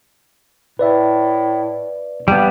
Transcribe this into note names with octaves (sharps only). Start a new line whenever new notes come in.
A2 B4 D5 E5
G2 G3 B3